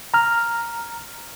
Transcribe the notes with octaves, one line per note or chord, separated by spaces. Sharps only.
A#5 F6